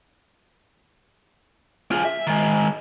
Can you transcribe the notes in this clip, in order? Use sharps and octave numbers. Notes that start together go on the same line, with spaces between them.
F4 G#4
E5
D#3 G#3